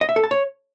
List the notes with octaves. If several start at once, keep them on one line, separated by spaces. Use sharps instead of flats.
D#5
E5
A4
A5
C#5